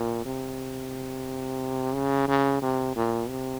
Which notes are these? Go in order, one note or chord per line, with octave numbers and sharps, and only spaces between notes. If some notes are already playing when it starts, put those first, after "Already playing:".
Already playing: A#2
C3
C#3
C#3
C3
A#2
C3